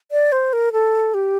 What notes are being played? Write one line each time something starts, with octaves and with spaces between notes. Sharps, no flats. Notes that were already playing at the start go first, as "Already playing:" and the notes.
D5
C5
A#4
A4
G4